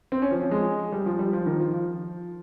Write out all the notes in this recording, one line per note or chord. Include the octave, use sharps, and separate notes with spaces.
C4
C#4
F3
F3
G#3
G3
F3
G3
F3
D#3
F3
F3